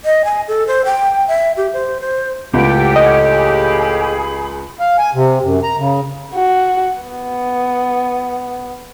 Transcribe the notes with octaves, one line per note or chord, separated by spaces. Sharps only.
D#5
G#5
A4
C5
G5
E5
G4
C5
C5
C#2 A2 G4 D5 F#5 G5
C#4 D#5 F#5
G#4 B5
F5
G#5
C3
F#2
A#5
C#3
F#4
B3